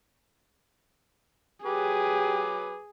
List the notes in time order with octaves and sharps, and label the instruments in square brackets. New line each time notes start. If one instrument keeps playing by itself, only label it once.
[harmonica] F#3 B4 D6 [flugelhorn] G4 [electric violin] G#4